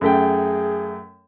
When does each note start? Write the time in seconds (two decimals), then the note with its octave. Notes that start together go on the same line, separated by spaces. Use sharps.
0.01 F#2 A3 G#4 G5